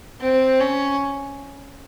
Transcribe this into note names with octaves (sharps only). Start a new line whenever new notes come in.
C4
C#4